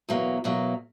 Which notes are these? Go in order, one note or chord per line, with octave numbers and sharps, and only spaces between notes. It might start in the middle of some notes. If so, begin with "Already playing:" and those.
E2 B2 F#3 A#3
E2 B2 F#3 A#3